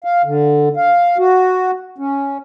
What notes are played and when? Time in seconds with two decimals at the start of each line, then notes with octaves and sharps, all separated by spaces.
0.04 F5
0.25 D3
0.76 F5
1.18 F#4
1.98 C#4